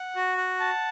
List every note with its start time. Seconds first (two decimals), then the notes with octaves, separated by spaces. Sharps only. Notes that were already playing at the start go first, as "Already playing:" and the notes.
Already playing: F#5
0.16 F#4
0.38 F#5
0.60 A5